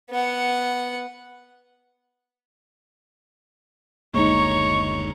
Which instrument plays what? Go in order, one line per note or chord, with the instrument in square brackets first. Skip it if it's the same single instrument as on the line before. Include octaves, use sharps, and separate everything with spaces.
[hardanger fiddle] B3 F#5
[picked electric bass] F#1 D2 A#3 [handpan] G#3 D#4 [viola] C#5 A#5 [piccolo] C#6